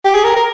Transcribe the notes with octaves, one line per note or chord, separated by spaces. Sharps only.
G4
G#4
A#4
A#4